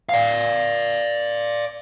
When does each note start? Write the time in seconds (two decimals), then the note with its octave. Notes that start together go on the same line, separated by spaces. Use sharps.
0.09 D5 F5